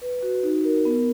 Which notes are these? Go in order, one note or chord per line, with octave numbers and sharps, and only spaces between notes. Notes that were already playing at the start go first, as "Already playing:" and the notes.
B4
F#4
D#4
A#4
B3